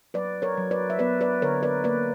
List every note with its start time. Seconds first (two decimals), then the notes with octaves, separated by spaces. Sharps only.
0.14 F#3 B4 D5
0.42 A#4 C#5
0.57 F#3
0.71 B4 D5
0.90 E5
0.99 B3 B4 D5
1.21 B4 D5
1.42 D3 A#4 C#5
1.63 B4 D5
1.84 A#3 B4 D5